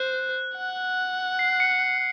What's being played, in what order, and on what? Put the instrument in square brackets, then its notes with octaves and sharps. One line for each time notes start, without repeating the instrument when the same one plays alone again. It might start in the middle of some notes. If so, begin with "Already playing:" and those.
Already playing: [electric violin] C5 [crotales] F#6
[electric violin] F#5
[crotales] C7
C#7